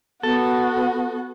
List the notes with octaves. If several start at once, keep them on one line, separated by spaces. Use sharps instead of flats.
B3 F#4 A4